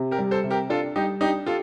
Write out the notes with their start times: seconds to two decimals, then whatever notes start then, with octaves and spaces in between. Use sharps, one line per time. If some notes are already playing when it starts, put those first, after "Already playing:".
Already playing: C3
0.11 G4 A#4
0.18 G3
0.31 A4 C5
0.44 C3
0.51 G4 A#4
0.70 D4 F4 A4
0.96 G3 D#4 G4
1.21 D4 D#4 G4
1.46 F4 G4 A4